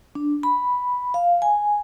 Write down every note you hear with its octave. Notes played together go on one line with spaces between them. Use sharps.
D4
B5
F5
G#5